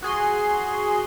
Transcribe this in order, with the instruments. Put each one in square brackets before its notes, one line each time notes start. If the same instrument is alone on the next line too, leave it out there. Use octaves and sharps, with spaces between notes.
[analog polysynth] F#4 G#4 C6